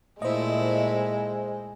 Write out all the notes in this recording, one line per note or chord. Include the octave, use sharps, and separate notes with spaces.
A#2 G#3 A3 E4 C5 D#5